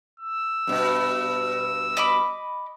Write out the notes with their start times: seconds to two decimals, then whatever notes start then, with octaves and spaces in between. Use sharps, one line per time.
0.20 E6
0.67 G2 B2
1.97 D#5 B5 D6